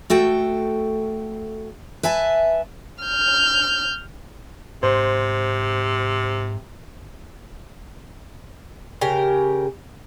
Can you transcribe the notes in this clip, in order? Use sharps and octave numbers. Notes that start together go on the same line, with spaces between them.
A3 F#4 A4 G5
B4 E5 G#5 A5
F6 G6
G#2 C3 C5
C#3 G4 A#4